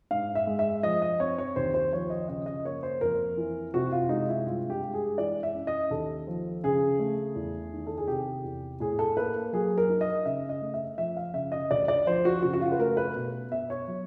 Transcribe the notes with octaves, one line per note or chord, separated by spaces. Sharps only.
G#2 F5
E5
G#3
E5
F3 D#5
D#5
C4 C#5
C#5
D#2 C5
C5
F3 C#5
D#5
C#3 D#5
D#5
A#3 C#5
C5
F2 A#4
E3
C3 F#4
F4
G#3 D#4
E4
G2 F4
G4
G#3
G#4
E3 D5
E5
C#4
D#5
D#2 A4
F3
C#3 G#4
A3
E2
D#3
A4
G#4
C3 G4
E2
A2 G#4
A4
A#3 B4
F#3 G#4
A#4
D#4
D#5
C#3 E5
D#5
A3
E5
F3 E5
F5
C#3 E5
D#5
D2 D5
D5
F3 C5
F#4
C#3 F#4
F#4
F4
B4
A3 A#4
B4
B2
B3 E5
C#5
F#3